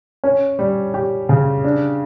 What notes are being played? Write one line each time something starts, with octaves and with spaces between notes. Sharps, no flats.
C#4
G3
G4
C#3
D4